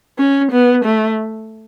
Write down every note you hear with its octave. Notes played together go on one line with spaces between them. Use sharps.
C#4
B3
A3